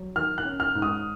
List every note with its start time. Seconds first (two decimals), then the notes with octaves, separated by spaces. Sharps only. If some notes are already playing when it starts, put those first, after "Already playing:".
Already playing: F#3
0.15 D#3 F6
0.38 F#6
0.45 C#4
0.60 F6
0.75 G#2
0.82 D#6